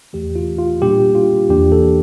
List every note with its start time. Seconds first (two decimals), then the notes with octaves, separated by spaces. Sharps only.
0.13 E2 E3 A3 G4
0.36 F4
0.59 F4
0.81 A#2 G3 A#3 D4 G4
1.15 F4
1.50 E2 E3 A#3 D4 G4
1.72 A4